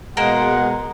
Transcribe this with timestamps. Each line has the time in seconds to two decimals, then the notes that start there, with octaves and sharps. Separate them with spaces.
0.17 B2 G#3 A#3 A#4 C5 F#5